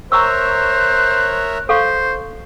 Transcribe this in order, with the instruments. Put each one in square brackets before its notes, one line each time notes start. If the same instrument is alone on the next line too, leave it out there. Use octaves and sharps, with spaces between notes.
[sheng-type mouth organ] A#4 C#5 E5 [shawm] C5 [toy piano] A#5 C#6 E6 [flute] F#6
[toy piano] A4 F5 C#6 [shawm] C5